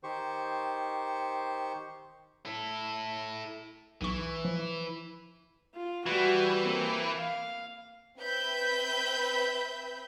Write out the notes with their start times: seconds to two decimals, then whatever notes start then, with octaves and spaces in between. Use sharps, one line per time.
0.03 D#3 G4 C5 C#6
2.46 E4 A4
4.01 B1 E3 C#6
4.45 F3
5.75 F4
6.06 E3 G3 F#4
6.63 A#3 C4
7.17 F5
8.18 C4 B4 E5 B5 G6